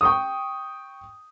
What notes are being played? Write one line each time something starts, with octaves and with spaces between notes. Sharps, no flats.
G5 C#6 D#6